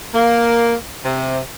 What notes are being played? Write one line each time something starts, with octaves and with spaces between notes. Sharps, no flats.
A#3
C3